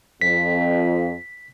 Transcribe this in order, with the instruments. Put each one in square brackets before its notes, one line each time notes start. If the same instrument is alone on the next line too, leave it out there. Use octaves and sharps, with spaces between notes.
[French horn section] F2 [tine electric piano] B6